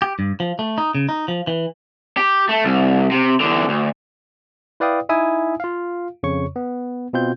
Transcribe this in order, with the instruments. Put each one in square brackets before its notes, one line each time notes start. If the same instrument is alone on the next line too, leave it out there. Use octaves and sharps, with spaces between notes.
[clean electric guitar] G4
G2
F3
A3
D#4
C#3
D#4
F3
E3
[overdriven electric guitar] G4
A3
C2
C3
E2 D3
D2
[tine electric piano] E4 B4 D5 F5 G5 D#6
D#4 E4 E5 G#5 D#6
F4 F5
F2 C#3 C#5 C#6
B3
B2 C4 F4 G6